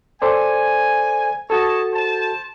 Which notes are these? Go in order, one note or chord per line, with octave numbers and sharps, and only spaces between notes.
A4 C5 D5 G#5
F#4 A4 C#5 D#5 A5
C5 A5